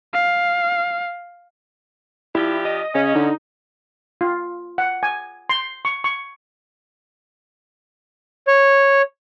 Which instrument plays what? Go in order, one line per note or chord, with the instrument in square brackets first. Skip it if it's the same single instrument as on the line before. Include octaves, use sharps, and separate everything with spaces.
[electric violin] F5
[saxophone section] F3 D4 G4 [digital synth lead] E4
[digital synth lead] D#5
[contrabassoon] C#3 [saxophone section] C#4
[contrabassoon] D3 [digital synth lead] D#4
[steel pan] F4
F#5
G#5
C6
C#6
C#6
[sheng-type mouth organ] C#5